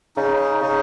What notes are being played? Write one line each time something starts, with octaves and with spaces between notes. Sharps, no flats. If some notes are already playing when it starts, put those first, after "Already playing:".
C#3 D#4
D#4
C#3 D#4